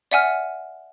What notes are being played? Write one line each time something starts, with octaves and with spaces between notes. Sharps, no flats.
D5 E5 F#5 G#5 F6